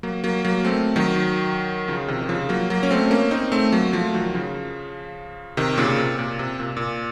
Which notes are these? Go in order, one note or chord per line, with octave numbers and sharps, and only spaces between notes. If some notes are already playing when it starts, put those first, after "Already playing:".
F#3 A#3
F#3 A#3
F#3 A#3
A3 C4
D#3 F#3
C#3 F3
C3 D#3
D#3
C#3 F3
F#3 A#3
F#3 A#3
C#4
A3 C4
A#3 C#4
C4 D#4
A3 C4
F#3 A#3
F3 A3
D#3 F#3
C#3 F3
C3 D#3
A#2 C#3
C3
A#2
C3
A#2
A#2